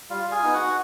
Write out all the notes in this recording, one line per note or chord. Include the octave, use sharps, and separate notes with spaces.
G3 F4 F5
G#4 G#5
B3 D#4
F#4 F#5